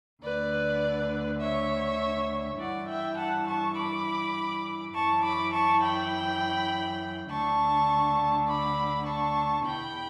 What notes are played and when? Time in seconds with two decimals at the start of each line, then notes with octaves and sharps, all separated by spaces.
0.23 D2 D3 B4 D5
1.41 C#5 E5
2.59 G2 E3 D5 F#5
2.88 E5 G5
3.18 F#5 A5
3.48 A5 C#6
3.77 B5 D6
4.94 F#2 E3 A5 C#6
5.24 B5 D6
5.53 A5 C#6
5.83 G5 B5
7.30 D2 D3 A5 C#6
8.47 B5 D6
9.06 A5 C#6
9.65 E2 B2 G5 B5